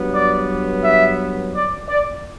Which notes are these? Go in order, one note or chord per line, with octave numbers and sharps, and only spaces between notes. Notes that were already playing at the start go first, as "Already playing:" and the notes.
Already playing: G2 F#3 B3
D5
E5
D5
D5